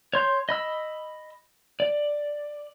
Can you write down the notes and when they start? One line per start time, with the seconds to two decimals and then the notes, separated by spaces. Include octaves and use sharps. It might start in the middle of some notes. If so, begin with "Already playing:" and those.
0.13 C#5 C6 G6
0.49 D#5 B5 E6
1.80 D5